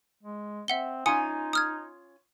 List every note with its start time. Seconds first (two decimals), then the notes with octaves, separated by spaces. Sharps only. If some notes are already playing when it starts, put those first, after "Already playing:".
0.23 G#3
0.68 C4 E5 F#5 G7
1.06 C#4 D#4 F4 G#5 D#6 C#7
1.53 D#6 F6 G#6